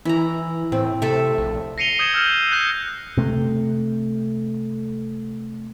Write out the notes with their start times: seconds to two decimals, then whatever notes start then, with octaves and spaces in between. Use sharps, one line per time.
0.05 E3 E4 A#5
0.72 A2 C4
1.02 C3 A3 A4 E5
1.38 A#1
1.78 A#6 C7 C#7 D#7 F7 G7
1.99 D#6 G6 G#6 A#6 C#7 E7
2.14 E6 F6 G6 E7
2.52 F#6 G6 A#6
3.17 C3 A3